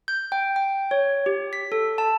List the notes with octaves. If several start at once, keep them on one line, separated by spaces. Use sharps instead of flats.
G6
G5
G5
C#5
G4
B6
A4
A5